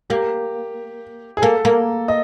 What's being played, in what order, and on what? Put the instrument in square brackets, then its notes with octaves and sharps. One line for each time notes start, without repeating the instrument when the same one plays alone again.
[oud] A#3 [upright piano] G4
[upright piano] G#4
[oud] A#3 [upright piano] A4
[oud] A#3
[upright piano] D#5